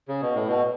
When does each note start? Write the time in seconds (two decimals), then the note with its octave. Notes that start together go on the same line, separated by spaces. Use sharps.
0.08 C#3
0.22 B2
0.35 A2
0.48 B2